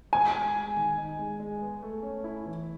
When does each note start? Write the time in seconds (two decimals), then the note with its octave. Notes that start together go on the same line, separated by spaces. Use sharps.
0.13 G#3 G#5
0.34 G#3
0.55 G#3
0.76 D#3
0.98 D#4
1.18 G#3
1.40 G#3
1.61 B3
1.82 A3
2.03 C#4
2.24 E4
2.46 E3